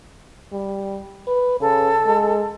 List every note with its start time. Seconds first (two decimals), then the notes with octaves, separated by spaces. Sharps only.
0.53 G3
1.27 B4
1.60 C#3 A4
2.06 G#3